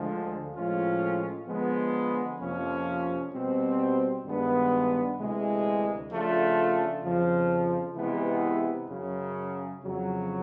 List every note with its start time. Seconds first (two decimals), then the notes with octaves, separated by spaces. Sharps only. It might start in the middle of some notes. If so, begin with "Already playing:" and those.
Already playing: D2 D3 F3 G#3
0.55 A2 F3 G#3 C#4 F4
1.47 D3 F3 G#3 B3
2.40 F2 C3 F3 A#3 C#4
3.32 B2 G3 C4
4.25 G2 D#3 G#3 B3 D4
5.18 D2 C3 E3 G#3
6.11 C#3 F3 A3 D4 F4
7.03 F2 C#3 F3
7.96 C3 E3 G#3 B3 E4
8.88 F#2 C#3 F#3
9.82 F2 C#3 F#3